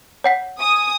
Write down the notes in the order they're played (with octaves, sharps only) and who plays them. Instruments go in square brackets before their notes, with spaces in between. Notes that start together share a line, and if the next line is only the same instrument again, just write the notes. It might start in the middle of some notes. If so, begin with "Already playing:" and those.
[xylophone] C#5 F#5 B6
[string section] G#5 D#6